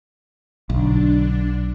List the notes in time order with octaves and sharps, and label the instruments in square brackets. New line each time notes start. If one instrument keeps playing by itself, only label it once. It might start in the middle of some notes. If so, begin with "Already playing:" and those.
[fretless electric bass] B1 [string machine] D3 D4